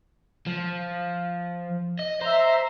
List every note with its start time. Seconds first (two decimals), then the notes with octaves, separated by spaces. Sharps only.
0.46 F3
1.99 D#5
2.21 C5 E5 A#5